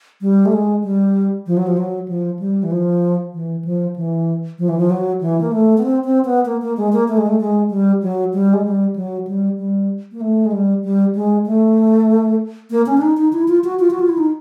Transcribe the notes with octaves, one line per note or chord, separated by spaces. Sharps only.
G3
A3
G#3
G3
F3
F#3
F3
F#3
F3
G3
E3
F3
E3
F3
E3
F3
E3
F3
F#3
E3
A#3
A3
B3
C4
C4
B3
A#3
A#3
G#3
A#3
A3
G#3
A3
G#3
G3
F#3
G3
G#3
G3
F#3
G3
G3
A#3
A3
G#3
G3
G3
G#3
A3
A#3
C#4
D4
D#4
D#4
E4
F4
F#4
F4
F#4
F4
E4
D#4